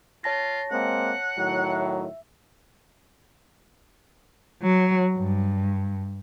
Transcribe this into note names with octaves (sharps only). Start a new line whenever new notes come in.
F4 C#5 A5 A#6
G#3 A#3 C4 F#5
A2 D#3 F#3
E5
F#3
G2